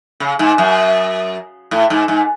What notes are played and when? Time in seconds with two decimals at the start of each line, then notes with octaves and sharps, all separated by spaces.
0.20 C#3
0.39 G#2
0.58 F#2
1.71 A2
1.90 G#2
2.08 G#2